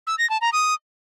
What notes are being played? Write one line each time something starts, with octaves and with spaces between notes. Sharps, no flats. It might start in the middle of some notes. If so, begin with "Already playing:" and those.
E6
A#6
A5
A#5
D#6